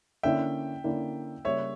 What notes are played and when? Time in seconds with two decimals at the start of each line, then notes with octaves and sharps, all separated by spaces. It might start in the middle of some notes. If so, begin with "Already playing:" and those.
0.23 D3 A#3 C#4 E4 E5 G5
0.84 D3 A#3 C#4 E4
1.45 C#3 G3 A#3 C#5 E5